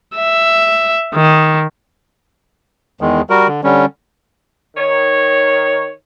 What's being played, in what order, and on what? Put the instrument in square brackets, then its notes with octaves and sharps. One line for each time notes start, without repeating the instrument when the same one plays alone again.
[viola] E5
D#3
[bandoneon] E2 D#3 G#3
G3 F#4 A#4
D3
D3 G3 C#4
[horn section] D#3 C#5